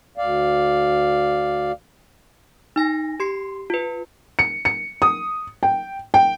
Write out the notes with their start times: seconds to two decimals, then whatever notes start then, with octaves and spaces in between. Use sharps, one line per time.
0.18 D2 D5 F5
2.76 D#4 G#5 A#6
3.20 G4 C6 C7
3.70 F4 B4
4.39 C#7
4.65 C#7
5.02 D#6
5.63 G5
6.14 G5